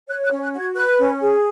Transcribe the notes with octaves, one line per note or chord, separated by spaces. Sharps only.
C#5 F#6
F#6
C#4
F#6
F#4
G#6
B4 F#6
C#4
G#4